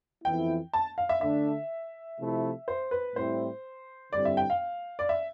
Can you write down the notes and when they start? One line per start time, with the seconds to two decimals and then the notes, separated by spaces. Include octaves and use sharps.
0.24 F2 E3 B3 E4 G5
0.73 A5
0.98 F5
1.09 E5
1.21 D3 A3 D4 E5
2.19 C3 F3 A3 E4
2.68 C5
2.91 B4
3.15 A2 G3 C4 E4 C5
4.13 G2 D3 G3 C4 E4 D5
4.25 E5
4.37 G5
4.50 F5
4.99 D5
5.09 E5